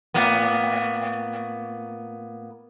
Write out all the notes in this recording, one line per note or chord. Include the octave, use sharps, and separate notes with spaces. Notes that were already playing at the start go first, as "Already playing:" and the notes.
A2 A#3 B3